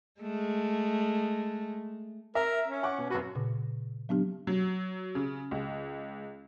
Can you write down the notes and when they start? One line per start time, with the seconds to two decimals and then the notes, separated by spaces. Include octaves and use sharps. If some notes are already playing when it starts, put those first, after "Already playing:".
0.21 G#3 A3
2.35 A#4 E5
2.68 C#4
2.83 F#5 C#6 D6
2.98 B2
3.10 F#2 F#4 B4
3.35 A#2 C#3
4.09 F#3 B3 D4 G4
4.47 F#3
5.15 C#3
5.51 C#2